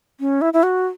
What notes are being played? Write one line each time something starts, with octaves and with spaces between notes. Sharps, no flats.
C#4
E4
E4
F#4